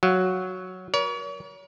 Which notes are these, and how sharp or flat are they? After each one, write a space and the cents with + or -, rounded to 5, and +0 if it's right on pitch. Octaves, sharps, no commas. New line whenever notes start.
F#3 +0 F5 +10
A#4 +40 C#5 +40